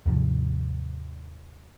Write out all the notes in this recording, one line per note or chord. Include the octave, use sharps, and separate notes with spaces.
D#2 G#2 C3 F3